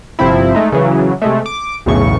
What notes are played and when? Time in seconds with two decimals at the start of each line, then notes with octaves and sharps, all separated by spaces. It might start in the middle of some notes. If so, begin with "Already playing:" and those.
0.19 G1 C3 F3 C4 E4
0.55 G#3 A3 D#4
0.72 C#3 E3 F#3
1.22 C3 G#3 A3
1.46 D6
1.86 B1 E2 A2 C#3 C#6